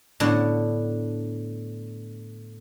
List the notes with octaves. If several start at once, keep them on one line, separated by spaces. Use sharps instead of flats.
A2 D3 B3 D4